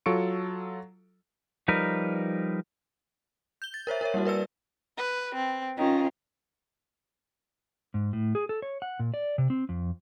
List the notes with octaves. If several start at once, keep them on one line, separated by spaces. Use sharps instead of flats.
F#3 F4 A4 C#6 C#7 D7
F3 G3 D#4 A#4 B4
G6 G7
A6
A#4 C5 C#5 E5
A#4 C#5 E5
G3 A#3 E4 F#4
A#4 B4 D5 E6
B4
C4
D#3 C#4 F4
G#2
A2
G#4
A4
C#5
F#5
A#2
D5
C3
C4
F2